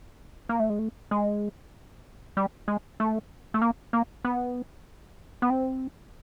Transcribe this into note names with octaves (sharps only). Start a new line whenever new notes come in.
A#3
A3
G#3
A3
G#3
G3
G#3
A3
A3
A#3
A#3
B3
B3
C4